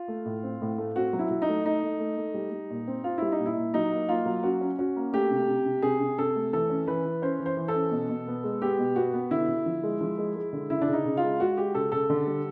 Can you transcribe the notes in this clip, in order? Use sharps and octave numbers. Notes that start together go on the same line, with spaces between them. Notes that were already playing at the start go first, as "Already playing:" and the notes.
Already playing: F4
A3
A2
C4
A2
A3
C4 F#4
F#3
E4
F#3
D#4
A3
A3 D#4
A3
A3
A3
G3
G3
A#2
C4
C4 F4
G3 E4
D#4
A#2
E4
A#2
F#3 D#4
A#3
A#3 F4
F#3
C#4 F#4
C#4
C#4 F#4
A#3
A3 G4
C3
C3
C3
C3 G#4
C3
C3 A4
A3
E3 A4
C#4
E3 B4
E3
C#4 C5
E3
C5
E3
A4
C#4
B2
B2
B3
G#3
B3 G4
B2
B3 F#4
B3
D3 E4
D3
F3
G#3
F3
G#3
G#3
D3
C#3 E4
D4
C#3
D#4
C#3
F4
G#3
G#3 F#4
G#3 G4
C#3 A4
C#3 A4
D3
G3